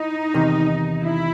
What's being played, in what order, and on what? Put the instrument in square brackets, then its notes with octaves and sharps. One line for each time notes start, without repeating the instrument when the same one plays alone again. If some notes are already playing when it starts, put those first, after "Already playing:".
Already playing: [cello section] D#4 [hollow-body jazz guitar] E4
[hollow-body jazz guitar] E2 C3 D#3
[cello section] E4